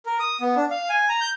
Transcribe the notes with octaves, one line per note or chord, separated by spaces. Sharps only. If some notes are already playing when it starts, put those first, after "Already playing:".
A#4
D#6
B3
D4
F5
G#5
A#5
G6